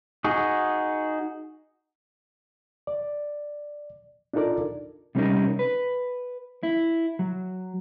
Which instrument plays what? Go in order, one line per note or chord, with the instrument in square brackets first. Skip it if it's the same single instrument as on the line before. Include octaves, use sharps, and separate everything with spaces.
[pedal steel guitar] D#4 F#4 G#4
[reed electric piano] D5
D4 D#4 F4 A4 A#4 D5
[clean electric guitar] C3 G3 B3 C#4 D#4 A#4
B4
E4
F#3